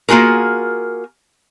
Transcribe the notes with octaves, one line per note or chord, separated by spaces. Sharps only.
A#3 F4 F#4 G#4 A#4